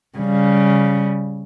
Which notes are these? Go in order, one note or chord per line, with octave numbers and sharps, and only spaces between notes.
C#3 G3